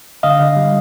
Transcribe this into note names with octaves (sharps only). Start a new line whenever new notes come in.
D3 D#5 F5
D3
G3